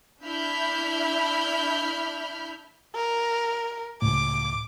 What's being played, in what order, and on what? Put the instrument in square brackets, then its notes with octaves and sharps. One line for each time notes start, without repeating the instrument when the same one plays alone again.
[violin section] D4 E4 E5 B5 F6 G6
[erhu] A#4
[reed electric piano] C#2 A2 [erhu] D6